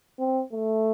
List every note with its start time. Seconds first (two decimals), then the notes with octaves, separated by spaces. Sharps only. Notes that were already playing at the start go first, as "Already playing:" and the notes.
0.19 C4
0.53 A3